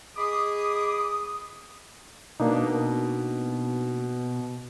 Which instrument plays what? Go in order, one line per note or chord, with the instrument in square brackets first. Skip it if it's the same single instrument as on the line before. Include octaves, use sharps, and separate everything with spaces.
[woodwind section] G#4 D#5 B5 D6 D#6
[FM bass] B2 [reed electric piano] A#3 D4 D#4